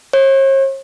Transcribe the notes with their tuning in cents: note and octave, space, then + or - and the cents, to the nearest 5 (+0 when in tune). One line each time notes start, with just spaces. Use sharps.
C#5 -45